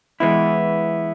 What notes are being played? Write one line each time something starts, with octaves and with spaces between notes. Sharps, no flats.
E3 G#3 B3 E4